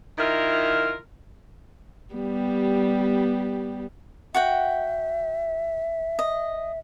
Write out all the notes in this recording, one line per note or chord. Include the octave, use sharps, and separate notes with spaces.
D#3 E4 F4 A#4
G3 B3 G4
F#4 E5 F#5 G5
D#5